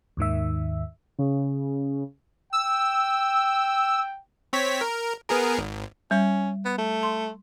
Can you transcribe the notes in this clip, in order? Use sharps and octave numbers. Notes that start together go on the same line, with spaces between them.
D#2 G#2 D#3 E5
C#3
G5 E6
C4 C#5 B6
A#4
B3 G#4 A#4
G#1
G3 C#4
B3
A3
C6